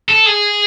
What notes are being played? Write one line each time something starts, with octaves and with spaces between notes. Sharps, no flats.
A4
G#4